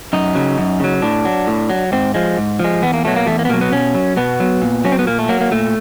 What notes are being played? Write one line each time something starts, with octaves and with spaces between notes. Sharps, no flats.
F#2 D#4
C#3 F#3
F#2
C#3 F#3
A2 D4
F#3
A2
F#3
G#2 C4
F3 G#3
G#2
F3 G#3
E2 B3
A#3
B2 F#3 A3
A#3
E2 A3
A#3
B3
B2 F#3 A#3
B3
B2 C#4
F#3
B2 B3
F#3
A#2
F#3 C#4
C4
B3
A#2 A#3
A3
F#3 A#3
A#3
A#2 A3